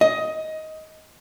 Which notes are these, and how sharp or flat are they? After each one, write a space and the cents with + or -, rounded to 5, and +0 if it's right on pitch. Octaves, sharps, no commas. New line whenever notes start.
D#5 +15